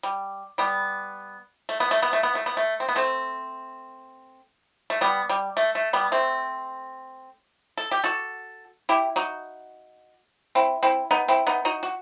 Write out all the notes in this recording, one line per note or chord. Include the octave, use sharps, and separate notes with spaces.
G3
G3 B3
A3
B3
A3
B3
A3
B3
A3
B3
A3
C4
B3
A3 C4
A3
G3 B3
G3
A3
A3
G3 B3
A3 C4
A4
G4
F#4 A4
E4 G4
D#4 F#4
C4 E4
C4 E4
B3 D#4
C4 E4
B3 D#4
D#4 F#4
F#4